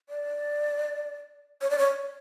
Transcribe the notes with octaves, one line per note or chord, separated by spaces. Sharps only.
D5
C#5
D5
C#5